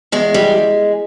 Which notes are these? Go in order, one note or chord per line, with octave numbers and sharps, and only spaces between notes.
E2 G#3
G3